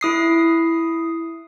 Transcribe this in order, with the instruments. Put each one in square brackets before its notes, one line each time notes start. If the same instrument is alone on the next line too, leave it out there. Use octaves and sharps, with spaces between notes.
[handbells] E4 D#6 C7